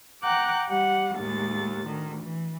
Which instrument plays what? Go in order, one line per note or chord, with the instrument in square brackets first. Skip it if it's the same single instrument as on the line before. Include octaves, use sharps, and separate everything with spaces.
[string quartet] F#5 G5 A#5 D6 F#6 G6
G3 G4 F#5
D#2 A2 G#3 A6
D2 D#3
E3